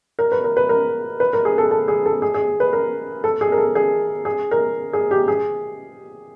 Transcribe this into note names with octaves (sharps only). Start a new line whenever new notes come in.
A#4
B4
A#4
B4
A#4
B4
A#4
G#4
A4
A4
G#4
A4
G#4
G#4
B4
A#4
A4
G#4
A#4
A4
G#4
G#4
A#4
G#4
G4
G#4